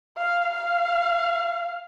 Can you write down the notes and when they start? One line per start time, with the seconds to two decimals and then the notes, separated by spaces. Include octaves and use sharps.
0.17 F5
0.54 F5